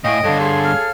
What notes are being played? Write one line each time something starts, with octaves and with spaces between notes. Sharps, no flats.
A2 E4 D#5 F5 G5 G#5
G2 D3 A4 C#5 F5
G#4 C6
F6